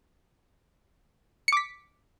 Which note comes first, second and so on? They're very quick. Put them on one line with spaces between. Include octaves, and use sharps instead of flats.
C#7 D6 B6